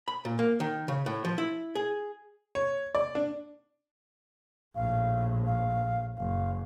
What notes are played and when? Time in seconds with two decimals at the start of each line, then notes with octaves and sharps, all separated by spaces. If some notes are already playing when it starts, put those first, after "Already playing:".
0.08 B5
0.25 A#2
0.39 A#3
0.60 D#3
0.88 C#3
1.06 A2
1.25 F3
1.38 E4
1.75 G#4
2.55 C#5
2.95 D5
3.15 D4
4.75 A#1 A2 F5
5.46 F5
6.18 F#1 F5